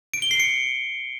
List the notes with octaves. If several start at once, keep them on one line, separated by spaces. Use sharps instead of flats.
D7
G7
C7
C#7